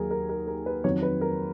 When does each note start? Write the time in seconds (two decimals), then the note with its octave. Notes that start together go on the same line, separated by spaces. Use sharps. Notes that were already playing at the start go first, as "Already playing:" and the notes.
Already playing: D#2 D#3 F#3 G#4 A#4
0.11 A#4
0.29 A#4
0.48 A#4
0.66 B4
0.84 F2 D#3 F#3 C#5
1.02 B4
1.21 A#4